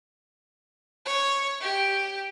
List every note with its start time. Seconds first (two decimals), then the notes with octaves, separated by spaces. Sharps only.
1.06 C#5
1.61 G4